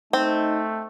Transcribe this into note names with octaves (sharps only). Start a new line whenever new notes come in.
A3 C4 D#4